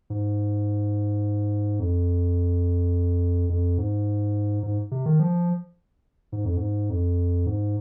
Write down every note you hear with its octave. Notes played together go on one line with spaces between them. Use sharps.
G#2
F2
F2
G#2
G#2
C3
D#3
F3
G#2
F2
G#2
F2
G#2